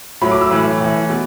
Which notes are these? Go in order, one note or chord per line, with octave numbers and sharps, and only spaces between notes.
A2 F#3 B5
D6
E6
A2 E3 B5
A2 E3
B2